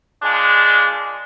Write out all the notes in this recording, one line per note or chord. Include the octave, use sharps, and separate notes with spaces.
A#2 G#3 D4